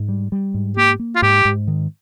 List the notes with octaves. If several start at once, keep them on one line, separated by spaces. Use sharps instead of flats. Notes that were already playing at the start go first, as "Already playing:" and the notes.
Already playing: G#2
G3
G3
G#2
A#3 G4
A#3
F4
G#2 G4
G#2
D#3